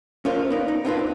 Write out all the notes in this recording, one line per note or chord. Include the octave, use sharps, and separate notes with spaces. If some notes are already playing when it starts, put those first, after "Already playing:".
C#4 D4 F4 A#4 C5
B3 D#4 D5
D#4
B3 C4 D4 D#4 F4 B4
C#2